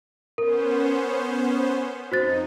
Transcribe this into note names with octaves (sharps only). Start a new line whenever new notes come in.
B3 C#4 A#4 C5
F2 D#4 F#4 C5 A6